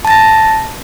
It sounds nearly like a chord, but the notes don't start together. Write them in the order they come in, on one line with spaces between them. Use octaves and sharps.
A5 A6 A#6